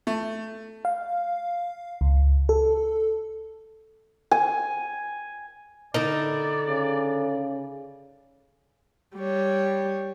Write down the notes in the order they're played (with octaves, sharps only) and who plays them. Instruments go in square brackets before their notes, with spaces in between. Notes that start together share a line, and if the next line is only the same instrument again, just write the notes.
[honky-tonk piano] A3
[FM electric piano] F5
C#2
A4
[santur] G#5
[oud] D3 E4 A#4 [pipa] D#4 [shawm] D5
[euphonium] C#3
[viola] G3 C#5